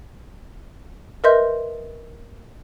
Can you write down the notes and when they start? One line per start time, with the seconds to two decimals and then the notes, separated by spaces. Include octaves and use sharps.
1.24 A#4 B4 D#5 E5 C6 G6